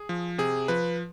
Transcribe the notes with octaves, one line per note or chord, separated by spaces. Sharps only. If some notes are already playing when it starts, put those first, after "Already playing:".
Already playing: G#4
F3
C3 G#4
F3 B4